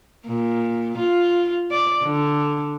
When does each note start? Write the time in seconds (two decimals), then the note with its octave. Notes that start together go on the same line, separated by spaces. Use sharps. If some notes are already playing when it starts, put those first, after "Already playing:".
0.28 A#2
0.98 F4
1.71 D5
2.04 D3